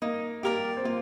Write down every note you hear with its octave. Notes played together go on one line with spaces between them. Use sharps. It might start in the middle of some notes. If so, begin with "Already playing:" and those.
A#3 D#4
A#3 G4 A#4 D5
C4
A#3 F4